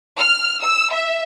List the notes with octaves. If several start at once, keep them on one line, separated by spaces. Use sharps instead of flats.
F6
E6
E5